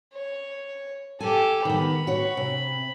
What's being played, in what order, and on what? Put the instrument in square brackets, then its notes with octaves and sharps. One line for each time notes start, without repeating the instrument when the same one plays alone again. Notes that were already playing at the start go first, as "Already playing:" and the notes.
[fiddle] C#5
[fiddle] G4 A4 [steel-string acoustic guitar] G#5
[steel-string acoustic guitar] D#3 B3 [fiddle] B5
[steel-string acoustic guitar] F#4 C#5
C3